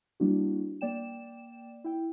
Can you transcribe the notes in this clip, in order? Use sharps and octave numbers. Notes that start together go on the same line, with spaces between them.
G3 A#3 D4 E4 F#4
A#3 D5 G5 E7
E4 G5